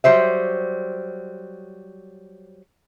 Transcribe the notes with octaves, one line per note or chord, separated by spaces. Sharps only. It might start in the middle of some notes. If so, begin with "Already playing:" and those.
F#3 G3 C5 E5